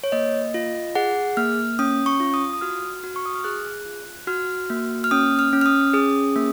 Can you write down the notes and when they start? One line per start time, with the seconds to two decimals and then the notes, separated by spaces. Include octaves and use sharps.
0.04 C#5
0.12 A#3 D#5
0.54 F4
0.95 G#4 F#5
1.37 A#3 F6
1.79 C#4 D#6
2.06 C#6
2.20 F4
2.34 D#6
2.53 D#6
2.61 F#4 F6
3.03 F#4
3.16 C#6
3.26 D#6
3.35 F6
3.44 G#4 F#6
3.86 F4
4.27 F#4 F6
4.70 A#3
5.04 F6
5.11 C#4 D#6
5.39 F6
5.53 C#4
5.61 F6
5.66 D#6
5.94 G#4 D#6
6.36 A#3